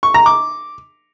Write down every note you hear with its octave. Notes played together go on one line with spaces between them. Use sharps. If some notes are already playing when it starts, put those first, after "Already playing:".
C#6
A#5
D6